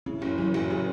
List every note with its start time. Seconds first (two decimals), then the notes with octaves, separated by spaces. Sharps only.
0.06 C#3 C#4 E4
0.22 F#1
0.38 E3 F#3
0.54 F#1
0.70 C#3